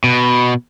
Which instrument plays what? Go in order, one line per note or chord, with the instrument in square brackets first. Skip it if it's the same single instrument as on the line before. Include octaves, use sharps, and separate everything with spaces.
[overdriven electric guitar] B2